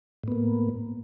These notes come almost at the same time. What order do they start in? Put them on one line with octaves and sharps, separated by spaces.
A2 B3 A#3